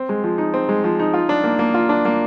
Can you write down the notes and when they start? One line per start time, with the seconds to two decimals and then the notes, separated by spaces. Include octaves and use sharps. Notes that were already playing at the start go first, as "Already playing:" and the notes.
Already playing: C4
0.09 G#3
0.24 F3
0.38 D#4
0.54 C4
0.69 G#3
0.84 F3
0.99 D#4
1.14 F4
1.29 D4
1.44 A#3
1.59 A#3
1.74 F4
1.89 D4
2.05 A#3